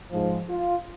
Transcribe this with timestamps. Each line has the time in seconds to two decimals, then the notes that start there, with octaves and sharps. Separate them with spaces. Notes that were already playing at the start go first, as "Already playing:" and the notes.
0.11 G#2 F3
0.49 F4